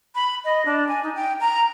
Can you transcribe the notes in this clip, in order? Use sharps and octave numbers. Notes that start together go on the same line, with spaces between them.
B5
D#5
D4
G#5
D#4
G5
A#5